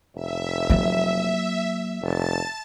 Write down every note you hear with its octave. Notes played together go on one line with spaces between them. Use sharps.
F1 E5
F#3 A#3
F1 A5 A6